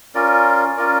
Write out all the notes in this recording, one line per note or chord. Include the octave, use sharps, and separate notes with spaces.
C#4 F4 A#4 D5
C#4 F4 A#4 D5